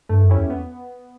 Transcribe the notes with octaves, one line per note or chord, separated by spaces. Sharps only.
G2 A3
F#2
C#4 E4 G4
E2
B3